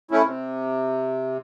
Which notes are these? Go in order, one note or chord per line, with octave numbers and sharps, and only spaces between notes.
A3 C#4 E4
C3